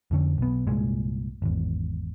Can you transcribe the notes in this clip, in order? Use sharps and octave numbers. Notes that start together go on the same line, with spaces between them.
F2 D3 C#4
B1 B3
C2 G2 A#2 G#3
G#1 E2